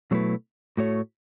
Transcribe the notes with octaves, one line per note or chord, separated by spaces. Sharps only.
B2 F#3 A3 E4 B4
A2 A3 F#4 C#5